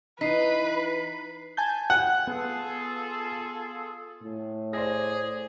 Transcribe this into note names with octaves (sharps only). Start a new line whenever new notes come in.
E3 D#4 B4 B6 C7
G#5 A5 G6
F#5
B3 F4 G#4 A4
A2
G#4 C5 D5 A#6